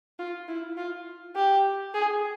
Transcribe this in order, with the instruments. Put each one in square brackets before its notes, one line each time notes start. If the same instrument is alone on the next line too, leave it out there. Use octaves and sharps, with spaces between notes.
[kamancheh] F4
E4
F4
G4
G#4